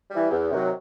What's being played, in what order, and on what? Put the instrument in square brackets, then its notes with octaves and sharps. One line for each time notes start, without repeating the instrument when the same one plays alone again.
[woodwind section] E3 G3
E2
C3 D#3 F#3